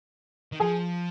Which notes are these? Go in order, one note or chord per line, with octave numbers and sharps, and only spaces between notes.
D#3
F3 G#4 G#5